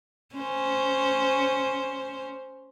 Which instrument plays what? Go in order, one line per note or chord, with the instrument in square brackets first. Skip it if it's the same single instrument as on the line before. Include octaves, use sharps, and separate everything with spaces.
[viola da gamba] C#4 C5